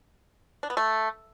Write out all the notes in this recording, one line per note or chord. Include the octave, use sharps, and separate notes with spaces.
D4
B3
A3